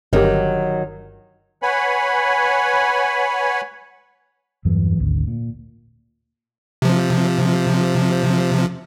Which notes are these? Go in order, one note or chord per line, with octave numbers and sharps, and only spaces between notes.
G1 D#3 F#3 G4
B4 C#5 F#5 G#5 B5
E2 G2 E3 F#3
G#1 D2
A#2
C3 F3